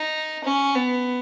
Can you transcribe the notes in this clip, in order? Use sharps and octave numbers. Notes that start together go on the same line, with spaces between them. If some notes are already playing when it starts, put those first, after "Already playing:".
Already playing: D#4
C#4
B3